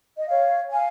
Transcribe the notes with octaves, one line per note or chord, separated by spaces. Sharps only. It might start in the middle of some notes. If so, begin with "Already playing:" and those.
D#5
C#5 F5
F5 G#5